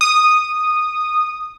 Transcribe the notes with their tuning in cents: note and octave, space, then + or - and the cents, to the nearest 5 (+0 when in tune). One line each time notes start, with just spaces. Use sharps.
D#6 -10